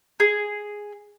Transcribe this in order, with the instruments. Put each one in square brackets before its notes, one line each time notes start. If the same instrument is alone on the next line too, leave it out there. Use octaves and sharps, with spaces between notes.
[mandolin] G#4